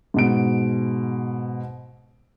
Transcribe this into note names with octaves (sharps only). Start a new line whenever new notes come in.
G#2 B2 D7